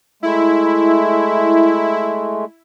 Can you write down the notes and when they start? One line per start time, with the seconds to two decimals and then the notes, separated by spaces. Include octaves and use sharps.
0.23 G#3 A3 E4